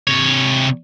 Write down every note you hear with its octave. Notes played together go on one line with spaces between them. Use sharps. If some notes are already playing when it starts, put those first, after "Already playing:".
C3 C#5